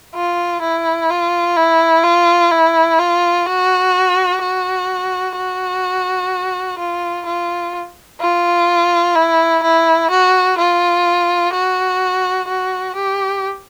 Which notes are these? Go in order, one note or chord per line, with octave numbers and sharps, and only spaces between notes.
F4
E4
F4
E4
F4
E4
F4
F#4
F#4
F#4
F4
F4
F4
E4
E4
F#4
F4
F#4
F#4
G4